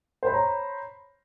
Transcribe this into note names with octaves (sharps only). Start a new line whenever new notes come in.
C5 C#5 A#5 B5